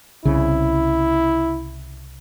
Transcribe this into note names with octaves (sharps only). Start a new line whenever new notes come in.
C2 C#3 E4